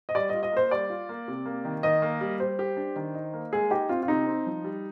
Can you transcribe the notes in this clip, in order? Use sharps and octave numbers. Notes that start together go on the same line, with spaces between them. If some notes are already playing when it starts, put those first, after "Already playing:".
D#5
G3 D5
D#5
F4
D#5
A#3 C5
G3 D5
F4
A#3
C3
A#3
D#3
D#3 D#5
A#3
G3
G3 C5
G4
D4
D#3
D#4
A#3
G#3 G#4
D#4 G4
C4 F4
F4
C3 D#4
C4
F3
G3